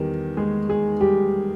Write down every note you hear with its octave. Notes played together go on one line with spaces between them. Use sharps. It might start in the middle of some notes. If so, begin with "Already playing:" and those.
Already playing: E2 D#3 G3 G4
G#3 G#4
G#3 G#4
G3 G4